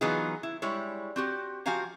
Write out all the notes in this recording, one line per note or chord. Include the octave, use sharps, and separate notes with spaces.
E3 F#3 B3 D#4 F4 G#4
E4
G3 G#3 E4 C#5
C4 F#4 G4
F3 F#4 G4 F5 G#5 A#5